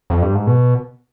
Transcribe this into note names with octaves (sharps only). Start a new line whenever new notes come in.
F2
G2
G#2
B2